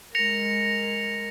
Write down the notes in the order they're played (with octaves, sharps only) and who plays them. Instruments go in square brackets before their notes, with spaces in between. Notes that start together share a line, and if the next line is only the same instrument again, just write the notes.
[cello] G#3 A#4 [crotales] A#6 C#7 F7